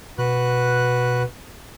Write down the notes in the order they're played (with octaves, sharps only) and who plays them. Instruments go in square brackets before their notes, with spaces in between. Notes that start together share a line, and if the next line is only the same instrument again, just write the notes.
[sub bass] B2 [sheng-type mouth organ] F#4 B4 F#6